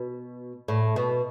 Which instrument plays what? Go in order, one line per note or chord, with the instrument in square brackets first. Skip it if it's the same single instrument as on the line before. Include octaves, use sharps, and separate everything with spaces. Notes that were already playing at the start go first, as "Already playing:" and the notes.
Already playing: [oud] B2
A2
B2